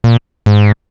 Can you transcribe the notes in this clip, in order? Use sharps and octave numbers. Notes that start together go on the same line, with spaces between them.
A#2
G#2